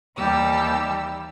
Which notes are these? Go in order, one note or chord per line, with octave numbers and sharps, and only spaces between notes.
D#2 E3 G3 G4 E6